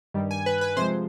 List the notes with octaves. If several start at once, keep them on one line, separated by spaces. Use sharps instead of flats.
G2 D#3 G3
G#5
B4
B4
C3 F3 G#3 C5